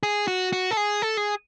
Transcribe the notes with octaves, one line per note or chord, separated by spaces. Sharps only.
G#4
F#4
F#4
A4
G#4
A4
G#4